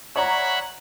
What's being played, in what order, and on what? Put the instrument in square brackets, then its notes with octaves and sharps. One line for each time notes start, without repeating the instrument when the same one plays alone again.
[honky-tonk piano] C#5 D5 A#5 [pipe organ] E5 F#5 B5